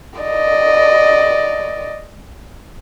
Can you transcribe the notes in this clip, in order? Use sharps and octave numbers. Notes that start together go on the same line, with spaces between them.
D5 D#5